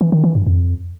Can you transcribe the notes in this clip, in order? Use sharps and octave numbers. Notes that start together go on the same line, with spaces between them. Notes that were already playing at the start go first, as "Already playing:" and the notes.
E3
D#3
E3
G2
F2